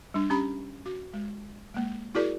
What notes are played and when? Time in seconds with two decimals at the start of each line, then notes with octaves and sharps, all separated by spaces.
0.14 G3 D4
0.30 C#4 G4 A#5 B5
0.86 F#4
1.13 G#3
1.74 G#3 A#3
2.15 E4 F#4 G#4 A#4 D5